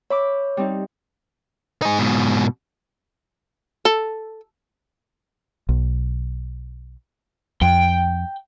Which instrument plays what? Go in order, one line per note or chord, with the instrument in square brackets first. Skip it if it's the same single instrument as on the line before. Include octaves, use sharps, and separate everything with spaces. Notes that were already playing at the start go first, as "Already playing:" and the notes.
[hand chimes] C#5 [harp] E5 B5 D6
[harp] G3 C4 D#4
[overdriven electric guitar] D#4 G#4
G#2 B2
[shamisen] A4
[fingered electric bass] B1
[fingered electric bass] F2 [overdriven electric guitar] G5